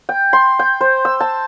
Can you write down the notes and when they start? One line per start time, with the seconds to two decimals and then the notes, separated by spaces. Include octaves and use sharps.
0.09 G5
0.33 C6
0.59 G5
0.81 C5
1.05 E6
1.20 A5